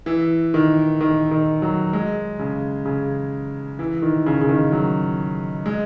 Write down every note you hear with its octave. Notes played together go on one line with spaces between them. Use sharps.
E3
D#3
D#3
D#3
F#3
G#3
C#3
C#3
E3
D#3
C#3
C#3
D#3
F#3
G#3